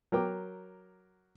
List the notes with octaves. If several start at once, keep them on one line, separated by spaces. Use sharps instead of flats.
F#3 A#4 G5 D6